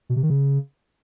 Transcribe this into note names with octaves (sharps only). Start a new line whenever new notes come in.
B2
C3
D#3
C#3